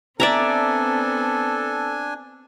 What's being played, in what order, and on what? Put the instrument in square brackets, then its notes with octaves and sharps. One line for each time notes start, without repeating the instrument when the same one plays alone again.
[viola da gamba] B3 C4 [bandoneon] D4 G#5 [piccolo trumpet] A4 [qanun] D5 E5 A#5